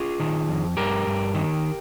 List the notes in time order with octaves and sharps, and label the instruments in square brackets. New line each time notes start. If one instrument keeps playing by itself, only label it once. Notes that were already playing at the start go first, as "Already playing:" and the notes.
Already playing: [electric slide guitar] F4 G#4
D#3
F2
G2 G4 A#4
G2
D#3